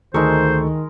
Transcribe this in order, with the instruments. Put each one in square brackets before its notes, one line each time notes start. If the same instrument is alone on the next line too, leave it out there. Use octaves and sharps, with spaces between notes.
[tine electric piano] D2 A4 C#6 [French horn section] D#3 [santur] G#3 A#4 [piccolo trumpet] C5